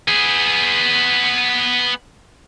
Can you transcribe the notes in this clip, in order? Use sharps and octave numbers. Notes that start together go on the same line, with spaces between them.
B3 G#4